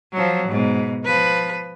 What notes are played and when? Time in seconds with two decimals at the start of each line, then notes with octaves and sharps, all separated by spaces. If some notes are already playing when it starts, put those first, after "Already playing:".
0.13 F3 F#3
0.48 G#2 B2
1.05 F3 B4